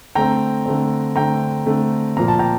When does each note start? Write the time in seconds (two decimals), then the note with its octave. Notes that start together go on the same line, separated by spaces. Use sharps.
0.15 D3 A3 C4 G5 A#5
0.66 D3 A3 C4
1.16 D3 A3 C4 G5 A#5
1.66 D3 A3 C4
2.17 A#2 F3 A#3 A#5
2.28 A5
2.39 G5 A#5